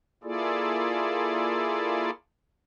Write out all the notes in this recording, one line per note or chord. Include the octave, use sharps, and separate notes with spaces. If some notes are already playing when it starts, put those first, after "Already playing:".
A#3 E4 F4 G#4 A4 D5